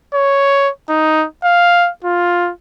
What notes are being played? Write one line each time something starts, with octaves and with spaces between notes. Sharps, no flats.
C#5
D#4
F5
F4